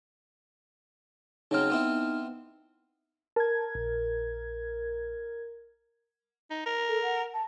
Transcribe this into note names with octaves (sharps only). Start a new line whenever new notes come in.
C#3 F#3 C4 D#4 F6
B3 C4 E4
A#4 A5 G#6
A#1
D#4
A#4
A4
F#5
A5